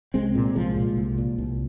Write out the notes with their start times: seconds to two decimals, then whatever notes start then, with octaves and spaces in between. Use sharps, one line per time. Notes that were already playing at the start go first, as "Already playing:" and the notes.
0.14 C2 G#3 C4
0.35 A#2
0.55 C2 F3 G#3
0.76 A#2
0.97 C2
1.18 A#2
1.38 C2